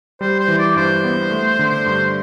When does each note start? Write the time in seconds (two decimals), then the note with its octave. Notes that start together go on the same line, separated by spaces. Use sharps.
0.21 G3 C5
0.40 C5
0.48 E3
0.58 D5
0.76 G2 C5
1.04 B3
1.31 A3
1.59 D3
1.86 G2